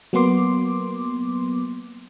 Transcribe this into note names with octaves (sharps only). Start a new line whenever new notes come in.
F#3 A#3 B3 C6 D6